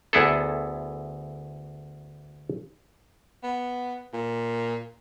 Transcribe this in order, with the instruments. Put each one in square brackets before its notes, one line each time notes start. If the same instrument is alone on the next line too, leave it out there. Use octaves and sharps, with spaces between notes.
[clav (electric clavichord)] D2 B3 E4 G#4 A4
[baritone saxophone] B3
A#2